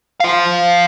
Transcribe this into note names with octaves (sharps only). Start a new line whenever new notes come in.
C5 F5